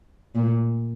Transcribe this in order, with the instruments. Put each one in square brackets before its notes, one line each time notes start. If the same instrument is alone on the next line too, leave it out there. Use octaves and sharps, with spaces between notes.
[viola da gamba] A#2